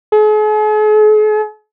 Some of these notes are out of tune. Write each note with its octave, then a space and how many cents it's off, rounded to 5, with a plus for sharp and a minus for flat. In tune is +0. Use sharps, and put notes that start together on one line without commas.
G#4 +45